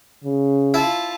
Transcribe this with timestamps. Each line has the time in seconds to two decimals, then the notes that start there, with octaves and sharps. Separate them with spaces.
0.24 C#3
0.74 E4 F4 A5